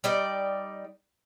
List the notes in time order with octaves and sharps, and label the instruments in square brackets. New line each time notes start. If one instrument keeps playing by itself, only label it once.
[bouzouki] G3 D#4 D5